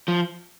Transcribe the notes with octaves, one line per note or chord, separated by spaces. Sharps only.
F3